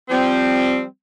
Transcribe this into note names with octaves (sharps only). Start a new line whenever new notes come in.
F3 G3 C4